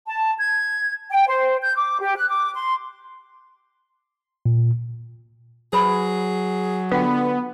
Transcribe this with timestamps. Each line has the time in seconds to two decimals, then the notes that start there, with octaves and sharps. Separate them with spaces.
0.07 A5
0.38 G#6
1.11 G5
1.27 C5
1.62 G6
1.76 D6
2.01 G4
2.17 F#6
2.30 D6
2.54 C6
4.46 A#2
5.73 F#3 G#4 B4 C5 B5
6.92 D3 B3 F4 F#5 G5